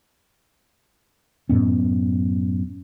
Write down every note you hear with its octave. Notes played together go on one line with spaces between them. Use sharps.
F#2 A2 B3 C#4